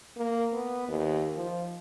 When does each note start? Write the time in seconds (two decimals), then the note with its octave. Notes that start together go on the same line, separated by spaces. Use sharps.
0.17 A#3
0.53 B3
0.88 D#2
1.36 F3